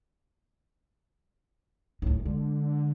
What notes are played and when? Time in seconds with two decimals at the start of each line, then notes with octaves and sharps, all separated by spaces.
2.02 D2 A2 D#4
2.25 D3 G#3